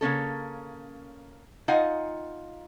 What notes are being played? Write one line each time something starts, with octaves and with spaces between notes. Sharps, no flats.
C#3 A#3 C#4 A4
D#4 F4 D#5 F5 F#5 G#5